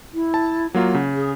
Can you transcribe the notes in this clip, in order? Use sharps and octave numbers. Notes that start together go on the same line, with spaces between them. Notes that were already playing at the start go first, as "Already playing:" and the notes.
E4
A5
F#3 A#3 F4 F#5
C#3
G#4